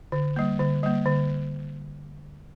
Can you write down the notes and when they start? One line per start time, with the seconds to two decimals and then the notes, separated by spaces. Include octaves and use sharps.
0.12 D3
0.36 G3 A#3
0.60 D3
0.83 G3 A#3
1.06 D3